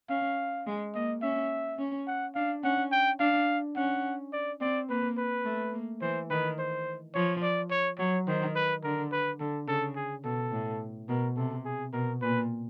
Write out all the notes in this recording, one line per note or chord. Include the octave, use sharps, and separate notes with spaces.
C#4 F5
G#3
A#3 D#5
C#4 E5
C#4
F#5
D4 F5
C#4 F#5
G5
D4 F5
C#4 F#5
D5
C4 D5
A#3 B4
B4
A3
A#3
E3 C5
D#3 B4
C5
F3 C#5
D5
C#5
F#3 C#5
D#3 C5
B4
D3 A#4
B4
D3 A4
C#3 A4
G#4
B2 A4
A2
B2 A#4
C3 A4
G#4
B2 A#4
A#2 B4